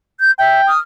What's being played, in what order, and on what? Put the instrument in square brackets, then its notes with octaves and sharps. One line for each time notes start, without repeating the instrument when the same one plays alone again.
[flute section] G6
[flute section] E5 [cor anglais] G5
[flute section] D#6 F6